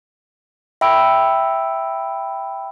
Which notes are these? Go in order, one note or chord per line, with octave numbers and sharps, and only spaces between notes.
E5 G5 B5 E6 D7